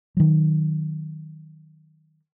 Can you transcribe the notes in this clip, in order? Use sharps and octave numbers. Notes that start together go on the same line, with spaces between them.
D#3 F#3